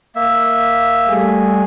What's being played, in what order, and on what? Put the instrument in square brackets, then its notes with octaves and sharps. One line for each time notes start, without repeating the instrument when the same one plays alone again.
[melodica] A#3 E5
[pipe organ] G3 A3 G#4